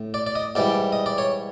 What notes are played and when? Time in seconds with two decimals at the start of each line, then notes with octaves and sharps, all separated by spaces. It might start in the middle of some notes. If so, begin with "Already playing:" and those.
Already playing: A2
0.14 D5
0.27 D5
0.35 D#5
0.55 G#2 E3 G3 D5
0.92 D#5
1.06 D5
1.18 C#5